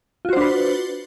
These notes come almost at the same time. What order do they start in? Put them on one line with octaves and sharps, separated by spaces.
F4 F#4 C5 D4 B4